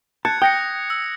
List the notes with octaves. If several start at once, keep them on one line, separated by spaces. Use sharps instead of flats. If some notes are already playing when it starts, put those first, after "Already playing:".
A5 F#6 G#6 C#7
G5 D#6 A#6 C#7
E6